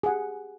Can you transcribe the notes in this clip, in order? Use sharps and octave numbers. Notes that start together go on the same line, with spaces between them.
G4 G#4 F#5